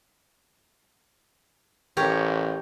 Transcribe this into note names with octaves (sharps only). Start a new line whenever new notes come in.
A1 G4 A#4 C#5